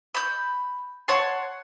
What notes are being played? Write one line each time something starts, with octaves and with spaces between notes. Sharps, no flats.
B5 G6
C#5 F#5 A5 C6